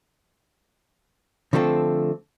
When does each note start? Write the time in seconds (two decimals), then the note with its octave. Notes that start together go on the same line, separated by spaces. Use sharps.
1.53 D3 F3 A3 C4 A4